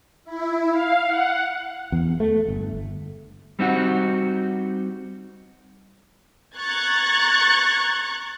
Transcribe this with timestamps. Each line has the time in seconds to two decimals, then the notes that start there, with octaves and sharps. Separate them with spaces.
0.25 E4
0.71 F5
1.05 F#5
1.92 E2
2.20 A3
2.48 G1
3.59 G3 C4 D#4 F#4
6.57 A#5 C#6 F#6 G#6 A6